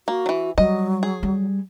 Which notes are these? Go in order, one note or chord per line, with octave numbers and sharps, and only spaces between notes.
A#3 F#4
E3 F#3
F#3 G3 D#5
G#4
G3